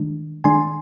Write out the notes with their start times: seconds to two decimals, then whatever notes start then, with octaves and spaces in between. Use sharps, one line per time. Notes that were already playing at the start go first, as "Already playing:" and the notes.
Already playing: D#3 G#3 D4
0.44 D#3 G#3 D4 G#5 C6